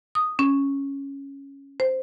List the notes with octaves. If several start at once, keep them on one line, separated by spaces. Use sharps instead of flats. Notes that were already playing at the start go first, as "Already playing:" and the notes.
D#6
C#4
C5